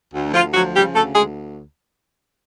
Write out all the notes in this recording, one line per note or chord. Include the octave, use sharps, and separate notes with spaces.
D2
D2 F3 F4
F3 F#3 F#4
C#3 G3 G4
D2 A3 A4
D2 G#3 G#4